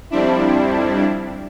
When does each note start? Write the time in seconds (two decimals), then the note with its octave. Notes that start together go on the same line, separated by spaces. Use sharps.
0.10 F2 G3 C4 D4 E4